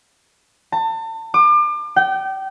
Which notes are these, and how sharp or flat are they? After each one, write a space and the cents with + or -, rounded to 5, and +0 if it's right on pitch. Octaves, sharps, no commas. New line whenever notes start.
A5 +35
D6 +35
G5 -30